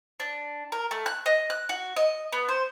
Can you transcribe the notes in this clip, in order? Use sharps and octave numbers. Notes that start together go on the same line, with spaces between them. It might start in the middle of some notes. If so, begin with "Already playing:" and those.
D4
A#4
A3
F#6
D#5
F#6
F#4
D#5
B3
C5